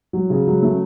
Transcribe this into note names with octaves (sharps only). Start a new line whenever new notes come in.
F#3
C#3
F#3
A3